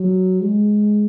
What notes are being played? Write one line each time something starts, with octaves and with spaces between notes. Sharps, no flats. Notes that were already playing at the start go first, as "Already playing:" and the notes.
Already playing: F#3
G#3